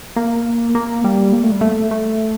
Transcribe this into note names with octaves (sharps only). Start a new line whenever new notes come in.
A#3
A#3
G3
A#3
A3
G3
A3
A3